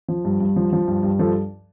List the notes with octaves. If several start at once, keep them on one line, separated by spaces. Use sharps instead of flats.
F3
G2
G2
F3
F3
G2
G2
F3 A4